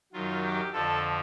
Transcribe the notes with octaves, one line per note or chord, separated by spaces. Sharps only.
F#2 D#3 F#3 F4
G4
F2 D3 F3 A4